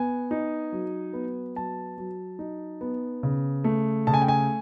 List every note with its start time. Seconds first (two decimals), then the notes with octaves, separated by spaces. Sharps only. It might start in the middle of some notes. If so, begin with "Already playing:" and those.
Already playing: B3 G#5
0.31 D#4
0.72 F#3
1.13 B3
1.56 F#3 A5
1.98 F#3
2.39 D#4
2.81 B3
3.23 C#3
3.64 A3
4.07 C#3 A5
4.14 G#5
4.22 G5
4.28 G#5